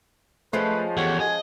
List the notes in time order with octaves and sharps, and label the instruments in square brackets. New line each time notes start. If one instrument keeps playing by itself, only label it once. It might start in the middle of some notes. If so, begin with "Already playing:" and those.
[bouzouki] F3 G#3 C#4 [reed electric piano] A3 [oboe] B4
[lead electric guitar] E2 [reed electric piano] G4 A4 F#5 [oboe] C#5
[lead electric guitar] D#5 [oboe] G#5